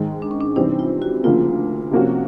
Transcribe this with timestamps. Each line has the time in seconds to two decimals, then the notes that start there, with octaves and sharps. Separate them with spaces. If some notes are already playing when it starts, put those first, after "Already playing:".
Already playing: G#2 D#3 G#3
0.22 D4
0.31 C#4
0.41 D4
0.56 C3 E3 G3 C4 D#4
0.79 F4
1.02 F#4
1.24 D2 C#3 F3 A#3 F4
1.91 C3 F3 A#3 C#4 F#4